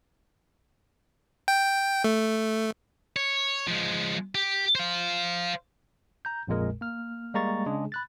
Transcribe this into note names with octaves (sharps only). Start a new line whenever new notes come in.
G5
A3
C#5
F3 G#3
G4
C5 F5
A#5 G6
A#1 F2 A#2 G#3 A#4
A#3 F6
G3 G#3 A#3 A#5 C#6 A6
C#3 G#3 D4 G#4
B5 F#6 A6